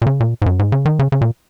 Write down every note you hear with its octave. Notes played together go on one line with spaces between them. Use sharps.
A#2
C#3
A#2
G#2
F#2
G#2
C#3
D#3
C#3
C#3
A#2